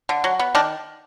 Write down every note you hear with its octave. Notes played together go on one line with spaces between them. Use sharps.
D3
F#3
B3
D#3 D4